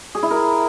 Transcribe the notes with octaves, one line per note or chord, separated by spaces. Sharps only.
G#4
E4
A#4